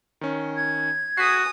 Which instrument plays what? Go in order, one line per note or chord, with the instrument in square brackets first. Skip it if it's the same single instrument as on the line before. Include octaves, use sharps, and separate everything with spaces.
[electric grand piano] D#3 C#4
[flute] G#6
[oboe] F#4 [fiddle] G#5 D#6 [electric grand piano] B6 C7